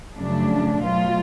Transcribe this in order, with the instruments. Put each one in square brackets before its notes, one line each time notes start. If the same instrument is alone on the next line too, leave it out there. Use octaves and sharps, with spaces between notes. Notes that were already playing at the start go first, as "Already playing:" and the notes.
[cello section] F#2 C#3 F3 A3 D4
B2 F#3 A3 F4